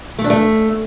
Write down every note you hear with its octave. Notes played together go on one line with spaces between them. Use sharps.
A3
D4
A3